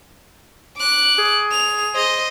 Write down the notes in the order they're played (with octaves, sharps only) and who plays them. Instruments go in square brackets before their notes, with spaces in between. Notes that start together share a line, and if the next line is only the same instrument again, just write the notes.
[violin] D6 F#6
[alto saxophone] G#4
[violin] F7
C5 D#5